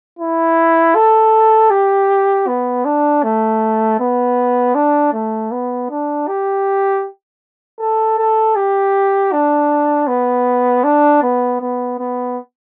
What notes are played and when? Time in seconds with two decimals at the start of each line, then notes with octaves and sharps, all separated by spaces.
0.19 E4
0.95 A4
1.70 G4
2.48 B3
2.85 D4
3.23 A3
4.00 B3
4.75 D4
5.13 A3
5.52 B3
5.90 D4
6.28 G4
7.80 A4
8.18 A4
8.56 G4
9.32 D4
10.08 B3
10.84 D4
11.23 B3
11.61 B3
11.99 B3